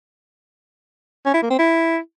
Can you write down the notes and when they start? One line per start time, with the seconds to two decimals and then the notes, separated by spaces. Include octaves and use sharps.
1.26 C#4
1.34 E4
1.42 A#3
1.50 C4
1.58 E4